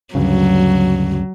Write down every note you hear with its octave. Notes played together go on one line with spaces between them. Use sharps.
D2 G2 C#3 F#3